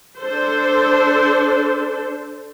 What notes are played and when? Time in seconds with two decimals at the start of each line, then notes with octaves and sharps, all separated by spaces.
0.19 D4 A4 C5